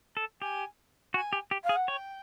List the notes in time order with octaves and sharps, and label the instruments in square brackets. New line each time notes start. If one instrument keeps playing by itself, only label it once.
[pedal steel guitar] A4
[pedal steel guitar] G4 [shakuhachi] G#5
[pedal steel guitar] F#4 [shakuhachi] G#5
[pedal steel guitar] G4
G4
[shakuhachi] F5
[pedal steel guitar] G#4
[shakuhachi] F#5
[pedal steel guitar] C#5 [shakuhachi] G5